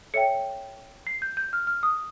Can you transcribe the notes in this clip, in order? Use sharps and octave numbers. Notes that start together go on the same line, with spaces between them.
A4 C#5 E5 G5 C#7
C7
G6
G6
F6
F6
D#6